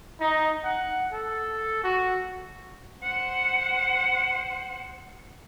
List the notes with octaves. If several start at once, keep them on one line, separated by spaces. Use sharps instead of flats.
D#4
F#5
A4
F#4
C5 F#5